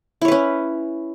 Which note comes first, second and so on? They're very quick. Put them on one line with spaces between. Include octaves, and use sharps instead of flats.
E4 C#5 B4 C#4